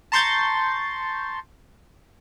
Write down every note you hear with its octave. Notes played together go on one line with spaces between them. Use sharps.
A5 A#5 C6 C#6 G6 A6